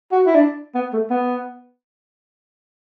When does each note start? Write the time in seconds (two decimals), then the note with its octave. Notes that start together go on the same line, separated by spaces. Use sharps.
0.12 F#4
0.26 E4
0.35 D4
0.75 B3
0.93 A3
1.10 B3